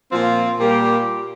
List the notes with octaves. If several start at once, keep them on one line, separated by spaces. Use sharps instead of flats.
A#2 F3 C4 F4
A#2 G3 A#3 G4